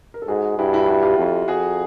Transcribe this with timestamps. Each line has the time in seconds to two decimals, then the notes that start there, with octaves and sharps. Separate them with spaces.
0.14 A#4
0.22 A4
0.28 G#2 F#4 G#4
0.58 G2 E4 F#4
0.73 E4 F#4
0.88 E4 F#4
1.03 F4 G4
1.18 F2
1.48 F2 F#4 G#4